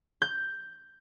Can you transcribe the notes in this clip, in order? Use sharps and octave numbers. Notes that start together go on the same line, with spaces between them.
G6